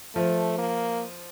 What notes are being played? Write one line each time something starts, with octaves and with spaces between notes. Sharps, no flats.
F3 A3
A#3